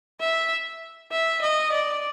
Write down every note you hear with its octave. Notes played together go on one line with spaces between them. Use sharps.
E5
E5
D#5
D5